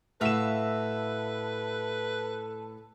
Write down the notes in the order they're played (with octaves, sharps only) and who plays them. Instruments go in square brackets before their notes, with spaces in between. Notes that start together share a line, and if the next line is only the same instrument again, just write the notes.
[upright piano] A2 E7 [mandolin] F#4 E5 F5 [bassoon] A4 [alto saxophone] B4